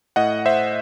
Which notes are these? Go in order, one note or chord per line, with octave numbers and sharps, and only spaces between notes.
A2 D#5 F#5
C5 E5